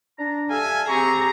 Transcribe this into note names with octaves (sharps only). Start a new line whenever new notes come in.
D4 A#5
G3 A4 E5 F5 G#5
C4 G4 G#4 A#5 C#6